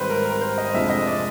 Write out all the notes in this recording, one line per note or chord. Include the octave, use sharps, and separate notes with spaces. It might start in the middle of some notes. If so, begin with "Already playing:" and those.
Already playing: G#1 G#2 D#3 G3 B4 C5
A#4
A#4
C5
D#5
F1 F2 D3 F3 G#3 E5
D#5
D5